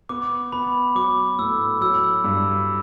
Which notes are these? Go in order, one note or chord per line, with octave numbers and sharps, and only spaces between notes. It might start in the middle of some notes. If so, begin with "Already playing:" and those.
B3 D6
B3 B5
F#3 D6
A2 E6
F#3 E6
G2